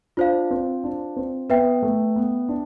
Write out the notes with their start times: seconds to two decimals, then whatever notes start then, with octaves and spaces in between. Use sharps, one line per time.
0.17 D4 F4 C5 F5
0.51 C4
0.84 D4
1.16 C4
1.50 B3 B4 E5 G5
1.82 A3
2.16 B3
2.49 D4